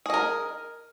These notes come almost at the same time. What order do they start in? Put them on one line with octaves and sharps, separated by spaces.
G#4 D#5 A#4